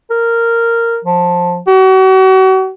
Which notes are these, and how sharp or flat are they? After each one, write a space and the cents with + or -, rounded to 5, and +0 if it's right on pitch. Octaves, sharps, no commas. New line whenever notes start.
A#4 -10
F3 +15
F#4 +40